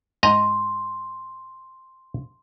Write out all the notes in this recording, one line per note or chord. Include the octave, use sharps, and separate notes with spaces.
G#2 D#5 A#5 C6